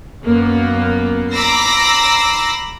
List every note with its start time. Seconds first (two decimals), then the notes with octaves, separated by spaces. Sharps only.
0.22 F#2 A#3 B3
1.32 A#5 B5 D6 E6 A#6 C7